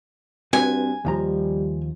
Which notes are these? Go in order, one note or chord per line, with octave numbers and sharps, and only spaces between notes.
G2 C4 F#4 B4 G#5
D#2 F3 G3 A#5